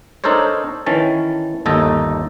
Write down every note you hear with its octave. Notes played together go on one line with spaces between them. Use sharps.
D4 D#4 A4 A#4 C5 C#5
D#3 E3 C#4 A5
G1 D#2 D#4 A4 A#5